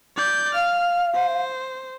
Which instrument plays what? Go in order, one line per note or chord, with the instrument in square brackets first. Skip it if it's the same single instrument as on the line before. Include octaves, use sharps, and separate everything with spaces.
[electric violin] D5 G6
[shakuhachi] F5 [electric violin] F6
[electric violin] C5